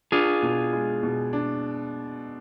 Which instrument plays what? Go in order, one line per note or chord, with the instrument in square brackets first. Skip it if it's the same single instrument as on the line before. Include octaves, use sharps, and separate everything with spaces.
[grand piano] D4 [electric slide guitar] F4 G#4
[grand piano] B2
G#3
B2
D4